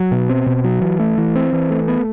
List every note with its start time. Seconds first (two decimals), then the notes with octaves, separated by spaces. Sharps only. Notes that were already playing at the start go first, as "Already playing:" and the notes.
Already playing: F#3
0.12 B2
0.29 C4
0.46 B2
0.64 F#3
0.82 E3
1.00 A3
1.18 E3
1.36 C4
1.53 E3
1.70 A3
1.88 B3